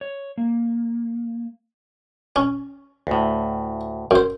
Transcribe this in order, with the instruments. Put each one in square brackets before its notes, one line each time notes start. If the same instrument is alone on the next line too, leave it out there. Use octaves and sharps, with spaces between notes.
[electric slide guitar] C#5
A#3
[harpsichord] C#4
[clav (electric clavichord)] D2 A2
[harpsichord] F#2 C5